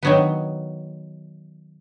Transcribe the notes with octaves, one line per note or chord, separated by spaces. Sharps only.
D#3 F#3 B3